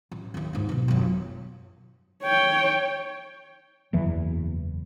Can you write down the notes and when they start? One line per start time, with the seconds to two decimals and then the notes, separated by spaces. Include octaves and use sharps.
0.12 A1
0.34 D#2 E4
0.53 D2 G#2
0.69 B2 E3
0.88 G1 F#2
2.24 C#5 G5
3.93 F#1 E2 E3